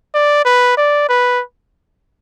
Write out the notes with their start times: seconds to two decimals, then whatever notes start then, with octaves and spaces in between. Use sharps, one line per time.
0.14 D5
0.45 B4
0.77 D5
1.09 B4